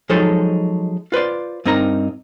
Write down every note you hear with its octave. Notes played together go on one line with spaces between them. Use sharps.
F3 F#3 G#3 D#4 A4 C5
F4 B4 C5 D5
G2 C4 D#4 A#4 A#5